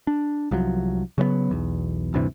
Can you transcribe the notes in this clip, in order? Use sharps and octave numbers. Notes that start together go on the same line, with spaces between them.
D4
C2 F3 F#3
C#3 F#3 G#3 B3
B1 E2
D2 G2 C3 E3